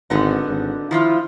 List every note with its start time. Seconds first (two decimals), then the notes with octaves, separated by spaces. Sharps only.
0.10 G#1 D3 B3 D#4
0.48 G#1
0.91 D#3 F3 E4 F4